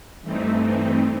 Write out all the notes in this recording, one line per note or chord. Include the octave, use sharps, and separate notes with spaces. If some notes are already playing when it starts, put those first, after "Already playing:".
G2 E3 A3 C4 D#4